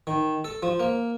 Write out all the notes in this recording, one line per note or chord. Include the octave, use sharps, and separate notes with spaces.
D#3
A4
F3
A#3